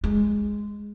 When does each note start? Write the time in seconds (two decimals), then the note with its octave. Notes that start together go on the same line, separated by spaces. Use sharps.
0.04 G#3